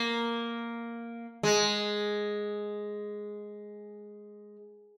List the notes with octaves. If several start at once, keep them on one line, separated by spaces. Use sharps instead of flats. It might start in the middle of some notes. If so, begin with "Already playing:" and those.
Already playing: A#3
G#3